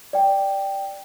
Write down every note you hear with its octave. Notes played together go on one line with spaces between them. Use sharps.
D5 G5